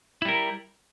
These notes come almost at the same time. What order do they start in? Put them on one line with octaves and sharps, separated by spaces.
E4 G3 A#4